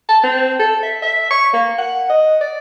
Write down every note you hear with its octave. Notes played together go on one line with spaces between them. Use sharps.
A5
C4
A4
E5
E5
C#6
A#3
F#5
D#5
D5